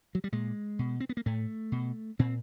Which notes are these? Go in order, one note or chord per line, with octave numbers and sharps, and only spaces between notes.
F#3
G3
A#2 G#3
B2
C4
B3
A#3
A2 A3
B2
A#2 C4